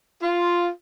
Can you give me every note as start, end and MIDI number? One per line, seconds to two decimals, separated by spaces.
0.23 0.69 65